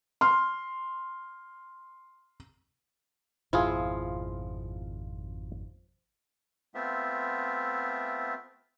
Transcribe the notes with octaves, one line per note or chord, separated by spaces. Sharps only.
C6 F6
G#1 F2 B2 F3 E4 F4 G#4
A3 B3 C4 F4 E5